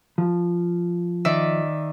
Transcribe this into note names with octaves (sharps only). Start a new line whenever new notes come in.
F3
D#3 D5 E5